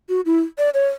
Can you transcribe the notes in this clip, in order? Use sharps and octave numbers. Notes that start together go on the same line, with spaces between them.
F#4
E4
D5
C#5